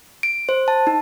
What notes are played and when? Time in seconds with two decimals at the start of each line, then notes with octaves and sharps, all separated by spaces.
0.23 D7
0.49 C5
0.68 A5
0.87 D#4